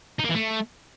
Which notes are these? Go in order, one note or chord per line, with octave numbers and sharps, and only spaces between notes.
D#4
A#3
E3
A3